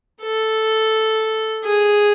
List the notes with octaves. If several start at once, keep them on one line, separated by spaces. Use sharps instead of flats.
A4
G#4